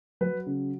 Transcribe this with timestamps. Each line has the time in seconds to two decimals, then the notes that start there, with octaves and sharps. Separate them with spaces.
0.21 F#3 B4
0.46 C#3